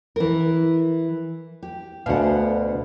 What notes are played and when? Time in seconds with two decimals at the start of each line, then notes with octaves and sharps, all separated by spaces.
0.16 E3 A#4
1.63 G4
2.06 D2 B2 F5 F#5